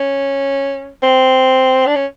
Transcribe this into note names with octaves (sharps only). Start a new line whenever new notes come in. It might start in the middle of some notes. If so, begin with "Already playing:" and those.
Already playing: C#4
C4
D4
C#4